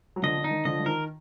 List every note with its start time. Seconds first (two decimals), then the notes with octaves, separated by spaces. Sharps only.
0.16 F#3
0.23 D3 F3 D#5
0.38 D3
0.44 D#4
0.51 D#3
0.65 D3 F3 D#5
0.80 F3
0.86 D#3 A#4